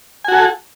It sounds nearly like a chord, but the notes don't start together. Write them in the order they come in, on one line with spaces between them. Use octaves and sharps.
G#5 F#4 A4